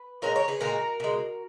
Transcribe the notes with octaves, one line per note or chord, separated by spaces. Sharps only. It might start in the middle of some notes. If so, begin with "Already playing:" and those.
Already playing: B4
A#2 G#3 A#4 C#5
A#4 C#5
G#4 B4
A#2 G#3 F#4 A#4
B2 G#3